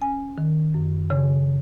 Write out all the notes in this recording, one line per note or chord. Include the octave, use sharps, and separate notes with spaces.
C#4 G#5
D#3
F#2
C#3